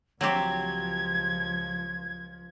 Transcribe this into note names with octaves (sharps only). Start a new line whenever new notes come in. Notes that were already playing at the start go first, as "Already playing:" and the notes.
C#2 F3 F#3 C4 G4 G#6